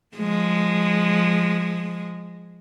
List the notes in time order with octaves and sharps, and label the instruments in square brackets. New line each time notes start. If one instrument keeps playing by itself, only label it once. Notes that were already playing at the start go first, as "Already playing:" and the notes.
[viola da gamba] F3 G#3